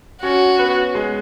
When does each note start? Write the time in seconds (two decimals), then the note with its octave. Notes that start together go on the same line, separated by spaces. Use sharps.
0.23 C#4 F#4 C#5
0.59 B3 B4
0.94 G#3 G#4